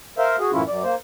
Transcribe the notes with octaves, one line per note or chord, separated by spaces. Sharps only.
A#4 C5 E5 F5
F#4 G#4
F#2 A2 E3 C#4 E4 F4
F#2 D5
A#3 C5